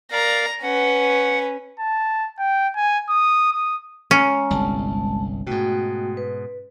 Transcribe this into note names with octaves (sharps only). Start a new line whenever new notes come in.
A#4 D5 F5 A#5
C#4 B4 F#5
A5
G5
G#5
D#6
D#6
G#3 C#4 G#5 A#5
G1 C2 G#3 A5
G#2 B2 A3 F#4 G5
B4